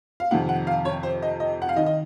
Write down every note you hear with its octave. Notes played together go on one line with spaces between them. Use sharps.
F5
F2 C3 D#3 F#5
F#5
F5
C#5
C5
D#5
D#5
F#5
F5
D#3 D#5
D#5